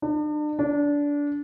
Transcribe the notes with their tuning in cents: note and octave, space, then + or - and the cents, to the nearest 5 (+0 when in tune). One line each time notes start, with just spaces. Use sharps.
D4 +40
D4 -20